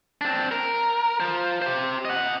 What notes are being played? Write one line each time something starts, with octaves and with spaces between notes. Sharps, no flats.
C4 D4
A#4
F4 C5
G4 C5
D#5 F#5